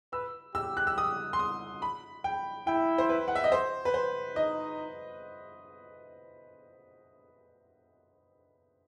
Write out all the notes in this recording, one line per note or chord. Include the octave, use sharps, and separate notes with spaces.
B4 E6
G4 E6
F#6
E6
D#6
C6
D#6
B5
G5
E4 G5
C5
B4
F#5
E5
D#5
C5
B4
C5
D#4 D#5